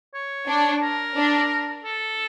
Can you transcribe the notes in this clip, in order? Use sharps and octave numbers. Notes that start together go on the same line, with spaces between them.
C#5
D4
A#4
D4
A4